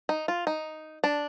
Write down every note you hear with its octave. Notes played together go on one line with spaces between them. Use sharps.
D#4
F4
D#4
D4